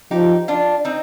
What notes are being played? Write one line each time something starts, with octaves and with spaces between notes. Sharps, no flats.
F3 D#4 G4
D4 F4
C4 D#4